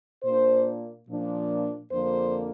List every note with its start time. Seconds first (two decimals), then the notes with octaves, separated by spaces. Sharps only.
0.23 A#2 A#3 D4 C5
1.08 A#2 F3 D4
1.92 F2 D3 F3 A#3 D4 C5